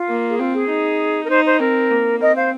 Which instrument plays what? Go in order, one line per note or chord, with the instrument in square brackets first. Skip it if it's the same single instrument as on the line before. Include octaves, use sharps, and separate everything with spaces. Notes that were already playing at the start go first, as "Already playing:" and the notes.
Already playing: [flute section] F4
[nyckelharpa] A#3
[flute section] G#4
[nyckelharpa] C4 [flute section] F4
[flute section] G#4
[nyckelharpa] D#4
[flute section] A#4
[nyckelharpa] D#4 [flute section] C5
[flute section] C5
[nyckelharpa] C4 [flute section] A#4
[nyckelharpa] A#3
[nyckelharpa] C4 [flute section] A#4 D#5
[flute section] C5 F5